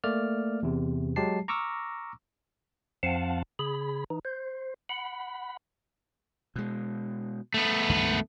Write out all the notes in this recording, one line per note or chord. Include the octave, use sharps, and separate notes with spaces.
A3 A#3 D5 F6
E2 C3
F#3 G#3 G4 A5 C7
A#5 C#6 D6 E6 F6 A#6
F2 F3 C4 F5 F#5 A5
C#3 G#4 B5
E3 D#4
C5
F#5 B5
B2 G#3
A3 B3
C#2 G2 D#3